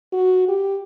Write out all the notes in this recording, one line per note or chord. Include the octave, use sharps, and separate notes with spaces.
F#4
G4